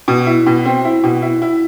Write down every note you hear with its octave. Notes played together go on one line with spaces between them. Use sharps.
B2
E4
B2
C4
E4
B2
E4
E4